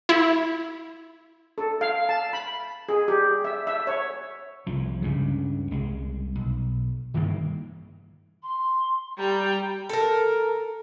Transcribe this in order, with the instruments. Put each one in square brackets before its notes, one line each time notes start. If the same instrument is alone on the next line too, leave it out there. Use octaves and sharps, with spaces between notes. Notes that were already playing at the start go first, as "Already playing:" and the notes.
[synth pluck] E4
[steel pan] A4
F5
A5
B5
G#4
G4
E5
E5
C#5
[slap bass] C2 F3
C#2 G2 C#3
C2 G#3
B1
G2 D#3 E3 A#3
[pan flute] C6
[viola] G3 G5 [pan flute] A#5
[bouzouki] A4 A#4